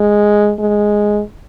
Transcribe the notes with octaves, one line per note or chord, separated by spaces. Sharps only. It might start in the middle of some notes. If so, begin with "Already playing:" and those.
Already playing: G#3
G#3